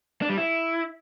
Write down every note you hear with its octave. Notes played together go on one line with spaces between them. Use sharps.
D4
G3
E4